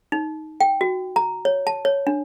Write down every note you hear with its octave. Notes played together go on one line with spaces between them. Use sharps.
D#4
G5
F#4
A#5
C#5
A5
C#5
D4